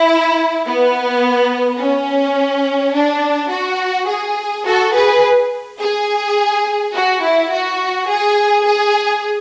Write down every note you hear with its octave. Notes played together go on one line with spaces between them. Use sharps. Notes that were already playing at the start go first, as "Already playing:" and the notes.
Already playing: E4
B3
C#4
D4
F#4
G#4
F#4 A4
G#4 B4
G#4
F#4
E4
F#4
G#4
G#4